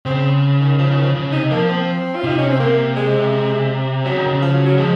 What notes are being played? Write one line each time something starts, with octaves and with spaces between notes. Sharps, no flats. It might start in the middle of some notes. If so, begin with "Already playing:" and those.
C#3 C4
D#3
C#3 F3
D#3
F3
C#3
C3 D#4
F3 A#3
C4
F4
C3 D#4
C#4
C4
C3 A#3
G#3
C#3 F#3
D#3
C#3
F3
F#3
F#3
F3 G#3